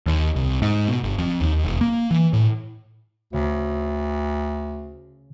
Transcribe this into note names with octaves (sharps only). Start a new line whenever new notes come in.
D#2
C2
G#2
B2
G1
F2
D#2
E1
A#3
E3
A2
D2 C#3